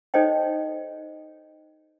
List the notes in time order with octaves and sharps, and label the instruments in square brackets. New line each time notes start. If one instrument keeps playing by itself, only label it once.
[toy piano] D#4 A4 C5 C#5 D#5 G5